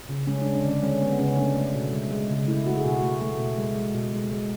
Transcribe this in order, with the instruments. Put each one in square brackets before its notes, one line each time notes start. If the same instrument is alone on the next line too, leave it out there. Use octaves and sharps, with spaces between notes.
[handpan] C#3
G#3 C#4
D4
G#3
D4
D3 C#4
G#3 C#4
G#3 B3
B3
C#3 C#4
A3 D4
A3
B2
G#3
G#3
C#3
A3 E4
A3 F#4
G#4
B2 F#4
A3
A3
B2
G#3
G#3
B2
G#3
G#3